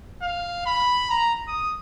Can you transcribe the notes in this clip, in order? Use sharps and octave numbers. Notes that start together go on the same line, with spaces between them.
F5
B5
A#5
D#6